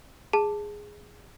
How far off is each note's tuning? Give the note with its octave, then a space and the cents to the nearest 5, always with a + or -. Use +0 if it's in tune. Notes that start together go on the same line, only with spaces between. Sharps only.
G#4 -5 A5 +0